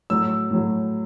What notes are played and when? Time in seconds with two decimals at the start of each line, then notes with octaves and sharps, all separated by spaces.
0.10 A2 F#3 E6
0.51 A2 F#3